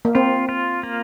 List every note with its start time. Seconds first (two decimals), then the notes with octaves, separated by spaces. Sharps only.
0.05 A#3
0.15 C4 F4
0.49 F4
0.83 A#3